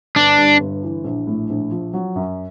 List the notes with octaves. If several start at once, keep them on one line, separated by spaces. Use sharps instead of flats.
G1 D4
G2
G1
E3
A#1
A2
A#1
F3
F#3
F#2